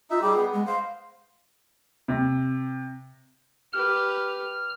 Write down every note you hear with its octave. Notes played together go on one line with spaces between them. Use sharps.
D#4 F4 E5
G3 G4 G#4
B3
G#3
C5 F5
C3
G4 B4 F6